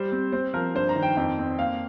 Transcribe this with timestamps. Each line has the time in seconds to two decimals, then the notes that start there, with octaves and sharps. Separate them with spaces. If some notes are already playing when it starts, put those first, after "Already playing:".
Already playing: G3 C5
0.12 C4
0.32 C4 C5
0.54 F3 A#4
0.75 G2 C5
0.89 A#5
0.96 D#3
1.03 G5
1.17 F2
1.38 C4
1.59 A#3 F5